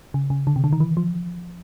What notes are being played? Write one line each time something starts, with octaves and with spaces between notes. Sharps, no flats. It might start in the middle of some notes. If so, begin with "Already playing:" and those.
C#3
C#3
D3
C3
D3
D#3
E3
F3